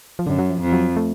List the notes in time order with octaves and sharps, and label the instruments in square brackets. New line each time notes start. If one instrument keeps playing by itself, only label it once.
[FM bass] F3
[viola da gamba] F#2 [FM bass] D3
[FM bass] F#3
F3
[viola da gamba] F2
[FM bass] F#3
A3